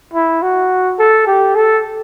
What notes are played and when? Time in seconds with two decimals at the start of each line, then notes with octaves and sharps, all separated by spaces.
0.14 E4
0.42 F#4
0.99 A4
1.27 G4
1.55 A4